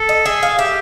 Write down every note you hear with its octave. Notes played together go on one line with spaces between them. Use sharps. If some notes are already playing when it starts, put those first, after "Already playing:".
Already playing: A4
D#5
G#4 E5
F5
G4 E5